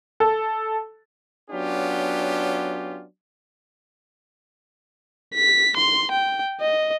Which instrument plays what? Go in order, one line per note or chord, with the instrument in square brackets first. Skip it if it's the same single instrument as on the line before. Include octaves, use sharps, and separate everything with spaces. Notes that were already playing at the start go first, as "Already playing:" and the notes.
[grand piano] A4
[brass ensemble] F#3 B3 C#4 D4 F4 G4
[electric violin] B6
C6
G5
D#5